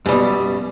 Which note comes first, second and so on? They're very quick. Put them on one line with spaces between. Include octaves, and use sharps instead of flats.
F#2 G3 B2